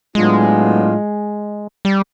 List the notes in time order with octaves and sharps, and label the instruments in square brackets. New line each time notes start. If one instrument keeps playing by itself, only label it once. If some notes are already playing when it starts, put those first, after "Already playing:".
[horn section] A2 F#3 B3 D4 F4 [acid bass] G#3
[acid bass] G3